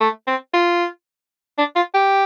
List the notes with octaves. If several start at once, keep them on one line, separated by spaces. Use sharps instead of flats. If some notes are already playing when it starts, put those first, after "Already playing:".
A3
C4
F4
D4
F4
G4